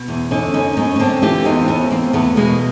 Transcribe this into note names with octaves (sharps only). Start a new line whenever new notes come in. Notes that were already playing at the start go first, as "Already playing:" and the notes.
Already playing: B2
E2
D3 C#4 D#4
F#2 C#4 D#4
F#2 C#4 D#4
C#4
D3 C4 D4
E3 F4 G4
E2 D#4 F4
C4
E2 B3 C#4
E2 A#3 C4
E2 A3 B3
B2 G#3 A#3